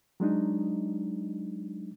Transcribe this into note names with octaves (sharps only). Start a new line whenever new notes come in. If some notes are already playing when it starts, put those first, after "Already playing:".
F#3 G#3 D4 D#4